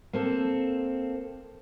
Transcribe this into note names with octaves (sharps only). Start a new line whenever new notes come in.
A#3 C4 A4